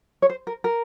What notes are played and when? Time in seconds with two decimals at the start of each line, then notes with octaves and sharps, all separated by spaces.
0.22 C#5
0.30 C5
0.47 A#4
0.64 A#4